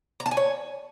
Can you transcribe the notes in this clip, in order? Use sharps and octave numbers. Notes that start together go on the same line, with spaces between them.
A#5
A5
G#5
C#5